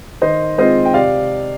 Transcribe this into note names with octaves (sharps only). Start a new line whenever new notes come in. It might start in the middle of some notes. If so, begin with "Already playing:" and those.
D#3 C5 D#5
G#3 C4 F4 C5 D#5
G5
C3 D5 F5